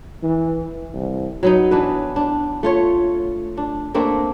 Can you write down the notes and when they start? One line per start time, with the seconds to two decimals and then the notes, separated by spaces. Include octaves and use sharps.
0.23 E3
0.94 C2
1.43 F#3 B3 D#4
1.71 E3 D4 B4
2.16 D4
2.63 A3 F4 C#5
3.57 D4
3.94 A3 A#3 C4 D4